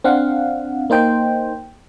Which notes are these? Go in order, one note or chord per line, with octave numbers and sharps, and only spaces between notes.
C4 D4 F5 F#5
A#3 D#4 C5 G5